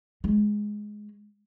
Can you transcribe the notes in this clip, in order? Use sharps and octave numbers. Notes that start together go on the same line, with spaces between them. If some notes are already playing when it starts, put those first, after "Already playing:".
G#3